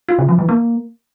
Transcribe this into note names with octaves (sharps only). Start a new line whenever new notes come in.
F4
C#3
F3
E3
A#3